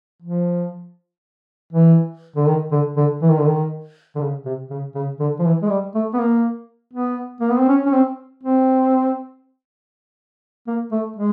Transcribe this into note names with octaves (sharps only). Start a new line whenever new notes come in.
F3
E3
D3
D#3
D3
D3
E3
D#3
D3
D#3
D3
C#3
C3
C#3
C#3
D3
F3
E3
G#3
G3
A3
B3
A#3
B3
A#3
B3
C4
C#4
C#4
C4
C4
A#3
A3
G#3